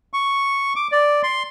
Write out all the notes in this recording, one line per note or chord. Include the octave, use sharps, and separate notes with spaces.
C#6
D6
D5
C6